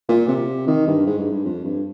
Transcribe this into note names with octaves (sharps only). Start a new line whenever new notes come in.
A#2
C3
D#3
G2
G#2
G2
G2
F2
G2